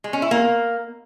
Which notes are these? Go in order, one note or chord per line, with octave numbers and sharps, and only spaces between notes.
G#3
C#4
E4
A#3